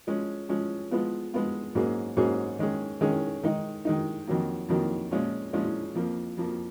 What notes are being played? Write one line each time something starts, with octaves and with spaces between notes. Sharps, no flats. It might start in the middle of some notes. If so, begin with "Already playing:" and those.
F3 G#3 C#4
F3 G#3 C#4
F3 G#3 B3 F4
F3 G#3 B3 F4
G#2 F#3 A#3 C#4 G#4
G#2 F#3 A#3 C#4 G#4
D#3 G#3 C#4 G#4
D#3 G#3 C#4 G#4
D#3 G#3 D#4
D#3 G#3 D#4
F2 D#3 F#3 A#3
F2 D#3 F#3 A#3
A#2 F3 G#3 C#4 F4
A#2 F3 G#3 C#4 F4
F2 F3 A#3
F2 F3 A#3